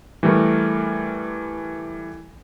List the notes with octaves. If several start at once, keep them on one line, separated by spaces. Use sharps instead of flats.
E3 G3 A3 A#4